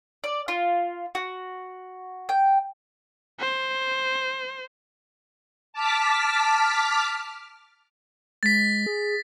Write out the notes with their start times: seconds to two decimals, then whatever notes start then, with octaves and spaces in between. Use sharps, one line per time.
0.24 D5
0.48 F4
1.15 F#4
2.29 G5
3.40 C5
5.73 A5 D6 F6 B6
8.43 G#3 A6 B6
8.86 G#4